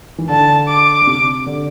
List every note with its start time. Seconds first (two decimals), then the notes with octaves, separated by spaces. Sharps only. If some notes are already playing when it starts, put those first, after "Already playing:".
0.18 E3
0.29 D3 A5
0.68 D6
1.02 D3
1.07 C3
1.46 D3